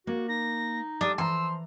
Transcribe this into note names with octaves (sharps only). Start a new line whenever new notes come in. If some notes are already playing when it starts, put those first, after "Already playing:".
A#3 F#4
D#4 A#6
G3 D4 D#6
E3 F3 A#5 C6 E6